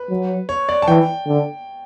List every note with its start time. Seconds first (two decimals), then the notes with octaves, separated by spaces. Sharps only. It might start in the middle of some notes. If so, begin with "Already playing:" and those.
Already playing: B4
0.10 F#3
0.49 C#5
0.69 D5
0.82 A5
0.88 E3 G5
1.27 D3